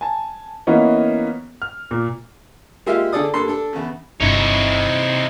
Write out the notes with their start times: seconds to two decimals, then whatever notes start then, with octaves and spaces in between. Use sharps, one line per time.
0.01 G#5 A5
0.67 E3 A#3 B3 C#4 D#4
1.62 F6
1.91 A#2
2.86 G#3 A#3 F4 G4 E5 F5
3.13 D3 G#4 A4 D5 D#6
3.34 G2 A#3 A4 C6
3.48 D4 A4
3.73 E2 C#3
4.21 G1 G2 C3 D#4 E4 C#5